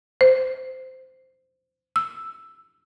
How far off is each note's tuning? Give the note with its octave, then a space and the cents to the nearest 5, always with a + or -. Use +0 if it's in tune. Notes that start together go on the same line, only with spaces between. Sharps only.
C5 -10
E6 +0